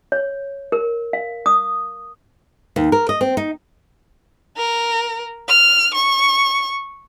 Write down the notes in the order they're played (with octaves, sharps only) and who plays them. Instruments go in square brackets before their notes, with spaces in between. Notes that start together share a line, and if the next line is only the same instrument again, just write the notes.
[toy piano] C#5
A#4
F5
D#6
[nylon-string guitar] D#2
A#4
D#5
C4
D#4
[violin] A#4
F6
C#6